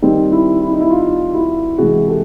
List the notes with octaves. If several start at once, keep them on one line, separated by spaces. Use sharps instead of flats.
D#3 G3 C4 D#4
E4
E4
D#4
E4
D#4 F4
E4 F#4
C3 E3 G#3 F#4 G#4
G4 A4